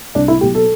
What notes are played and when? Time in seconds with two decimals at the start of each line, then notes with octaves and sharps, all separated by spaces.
0.15 C2 D4
0.28 E4
0.41 B2 F#3 G4
0.55 A4